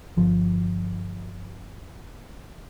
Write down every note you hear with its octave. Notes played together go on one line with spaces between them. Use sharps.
G1 F3